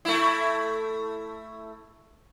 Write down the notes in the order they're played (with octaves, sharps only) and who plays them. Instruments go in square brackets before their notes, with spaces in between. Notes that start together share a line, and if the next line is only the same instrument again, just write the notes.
[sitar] A3 E4